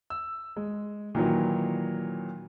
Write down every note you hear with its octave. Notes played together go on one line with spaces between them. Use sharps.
E6
G#3
A#2 D#3 E3 F#3